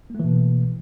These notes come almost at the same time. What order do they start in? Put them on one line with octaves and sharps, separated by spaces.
A#3 A3 E3 B2